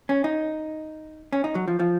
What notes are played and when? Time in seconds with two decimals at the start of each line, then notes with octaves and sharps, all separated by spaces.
0.09 C#4
0.24 D#4
1.33 C#4
1.44 D#4
1.55 F#3
1.68 F3
1.80 F3